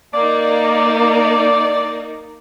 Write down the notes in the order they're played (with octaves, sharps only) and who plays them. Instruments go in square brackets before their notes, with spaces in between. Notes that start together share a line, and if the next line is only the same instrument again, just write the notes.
[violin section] A#3 D#4 [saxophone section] D5